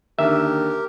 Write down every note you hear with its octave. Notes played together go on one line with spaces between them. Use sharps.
D#2 D3 G4 A#4 E5